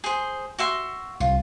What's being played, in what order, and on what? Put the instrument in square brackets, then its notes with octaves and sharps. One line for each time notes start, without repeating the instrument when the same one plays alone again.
[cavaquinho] G#4 C5
F#4 E5 C6
[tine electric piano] C2 [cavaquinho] F4